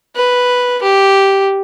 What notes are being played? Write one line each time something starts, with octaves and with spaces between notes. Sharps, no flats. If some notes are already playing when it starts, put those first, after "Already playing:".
B4
G4